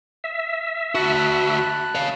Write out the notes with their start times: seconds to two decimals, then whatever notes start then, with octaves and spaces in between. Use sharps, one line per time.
0.24 E5
0.95 D2 F#4 A5 B5 F#6
1.95 C#5 F5